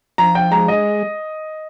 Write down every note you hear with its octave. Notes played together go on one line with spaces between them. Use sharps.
F3 A#5
G5
G#3 A#5
D#5